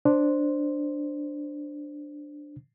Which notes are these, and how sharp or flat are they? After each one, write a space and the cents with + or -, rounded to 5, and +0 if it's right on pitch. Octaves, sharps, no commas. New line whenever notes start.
D4 +0 C5 +0